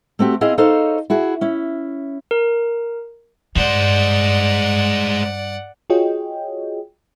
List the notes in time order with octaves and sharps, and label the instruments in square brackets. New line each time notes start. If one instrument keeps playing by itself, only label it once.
[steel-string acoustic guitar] A3 C4 F#4 G4
C4 E4 G#4 D#5 F5
D#4 A4 C5 C#5 D#5 F5
E4 F#4 G#4
C#4 E4
[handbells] A#4
[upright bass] G2 [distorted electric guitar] G#3 C5 [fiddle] D5 F#5
[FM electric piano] F4 F#4 G#4 C#5 D#5 G5